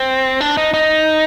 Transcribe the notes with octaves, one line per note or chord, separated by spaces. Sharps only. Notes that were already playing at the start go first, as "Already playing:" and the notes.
Already playing: C4
D4
D#4
D#4